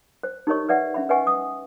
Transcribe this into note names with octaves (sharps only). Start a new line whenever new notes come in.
C5
D#4 G4 A#4 C#5 D#5 C#6
B4 D5 E5 F#5
C#4 E5 B5
B4 D#5 E5 F#5 G#5 C#6
D#6